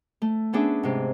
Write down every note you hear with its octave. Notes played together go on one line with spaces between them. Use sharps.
A3
B3 C#4 D4 G#4 E5
G#2 C3